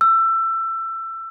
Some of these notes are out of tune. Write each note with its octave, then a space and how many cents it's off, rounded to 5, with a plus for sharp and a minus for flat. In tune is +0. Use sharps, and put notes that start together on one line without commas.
E6 +25